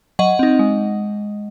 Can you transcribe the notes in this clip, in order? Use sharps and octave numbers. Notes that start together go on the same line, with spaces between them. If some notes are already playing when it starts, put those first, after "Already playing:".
F#3 D#5 F#5
C4 D#4
G#3